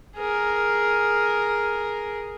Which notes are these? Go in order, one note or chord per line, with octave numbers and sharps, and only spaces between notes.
G#4 A#4